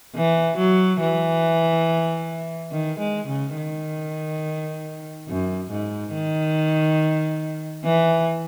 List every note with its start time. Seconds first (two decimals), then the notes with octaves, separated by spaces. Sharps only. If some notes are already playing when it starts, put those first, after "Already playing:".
0.15 E3
0.57 F#3
1.00 E3
2.71 D#3
3.00 G#3
3.28 C#3
3.56 D#3
5.28 F#2
5.71 G#2
6.13 D#3
7.84 E3